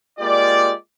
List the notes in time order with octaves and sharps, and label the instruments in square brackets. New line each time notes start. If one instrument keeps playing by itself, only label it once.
[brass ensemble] G#3 A#3 F4 G4 D5